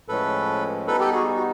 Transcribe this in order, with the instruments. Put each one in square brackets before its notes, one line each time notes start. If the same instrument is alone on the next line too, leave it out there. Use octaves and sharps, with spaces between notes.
[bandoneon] A2 F3 G#3 C#4 [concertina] A4 B4
[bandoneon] G3 B3 D#4 [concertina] A4 B4
[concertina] G4 A4
F#4 G#4
F#4